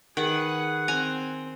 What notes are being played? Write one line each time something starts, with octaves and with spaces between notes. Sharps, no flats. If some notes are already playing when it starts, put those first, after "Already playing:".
D#3 G#4 B4 F#5
C4 G#5 A#5